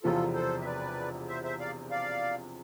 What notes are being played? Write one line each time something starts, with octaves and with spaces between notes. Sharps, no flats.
E1 E2 C3 F3 C4 F4 A4
A4 C5
E5
B4 D5
C5 E5
C5 E5
D5 F5
D5 F5